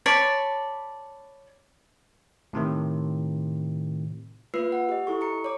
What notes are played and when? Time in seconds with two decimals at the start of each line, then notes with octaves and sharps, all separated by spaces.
0.06 C#5 D5 A5 B5
2.53 A2 C3 D#3
4.54 A#3 F4 B4 E6 C7
4.72 F#5
4.89 G4 D#5
5.07 E4 A4 C#6
5.21 A#5 C#7
5.44 C#5 D6